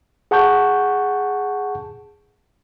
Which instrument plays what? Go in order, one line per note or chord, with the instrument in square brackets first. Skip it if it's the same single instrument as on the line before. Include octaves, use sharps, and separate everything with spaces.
[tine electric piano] G#4 F#5 A5 C#6 G6